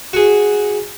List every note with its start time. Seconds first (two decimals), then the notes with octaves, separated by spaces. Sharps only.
0.13 F#4 G#4